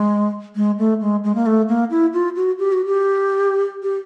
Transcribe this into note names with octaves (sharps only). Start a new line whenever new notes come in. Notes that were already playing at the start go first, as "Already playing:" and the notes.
Already playing: G#3
G#3
A3
G#3
G#3
A#3
A3
A#3
E4
F4
F#4
G4
F#4
G4
G4